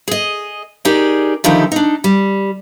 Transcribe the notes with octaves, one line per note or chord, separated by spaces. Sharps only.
G#4 D#5
D#4 G4 G#4 A#4 D5
D3 D#3 F3 D#4 E4 G4
D4 D#4
G3